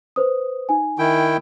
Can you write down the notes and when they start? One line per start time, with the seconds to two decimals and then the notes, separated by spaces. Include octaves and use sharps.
0.16 B4 C5 D#6
0.69 D#4 G#5
0.99 D#3 E4 G5